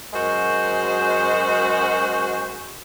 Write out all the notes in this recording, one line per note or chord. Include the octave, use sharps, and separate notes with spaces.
F#2 G#3 F#4 A#4 C5